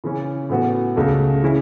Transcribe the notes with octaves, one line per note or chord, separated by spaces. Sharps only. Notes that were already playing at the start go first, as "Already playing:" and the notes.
C#3 E3 C#4
A2 E3 B3 F#4
C#2 C#3 A3
C#3 E3 C#4 E4